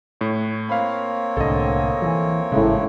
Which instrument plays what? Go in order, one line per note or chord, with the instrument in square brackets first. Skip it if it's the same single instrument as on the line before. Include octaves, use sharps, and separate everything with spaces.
[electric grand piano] A2 C#5
[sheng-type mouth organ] A#3 C4 C#5 [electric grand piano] F5 B5
[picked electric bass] C2 A2 D3 [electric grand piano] A4 D#5
[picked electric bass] E3 F3
[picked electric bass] G#1 C#3 [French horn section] A2 [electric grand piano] G#3